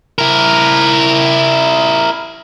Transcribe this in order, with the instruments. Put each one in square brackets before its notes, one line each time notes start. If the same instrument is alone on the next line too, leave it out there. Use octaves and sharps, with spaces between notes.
[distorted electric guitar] E4 A#4